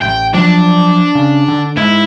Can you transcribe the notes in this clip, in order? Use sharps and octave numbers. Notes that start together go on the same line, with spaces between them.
A1 G5
F3 F#3 D4
C#3
D3
G#2 E4